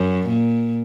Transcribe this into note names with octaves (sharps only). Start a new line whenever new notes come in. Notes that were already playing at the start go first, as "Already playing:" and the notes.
Already playing: F#2
A#2